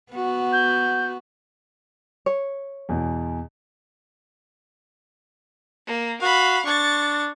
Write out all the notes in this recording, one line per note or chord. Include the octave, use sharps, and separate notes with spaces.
B3 F#4
G6
C#5
E2 B2 E3
A#3
F#4 F5 B5
D4 C#6 A6